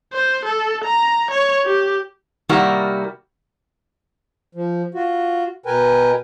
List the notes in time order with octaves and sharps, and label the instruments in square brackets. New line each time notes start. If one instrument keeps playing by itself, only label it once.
[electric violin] C5
A4
A#5
C#5
G4
[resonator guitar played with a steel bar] C3 D#3 G3 A#3 E4 F#4
[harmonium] F3
F4 F#4
B2 A#4 B4 G5 G#5